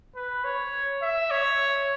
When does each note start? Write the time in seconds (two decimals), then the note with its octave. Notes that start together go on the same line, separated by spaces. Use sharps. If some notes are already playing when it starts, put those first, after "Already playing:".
0.16 B4
0.44 C#5
1.02 E5
1.31 C#5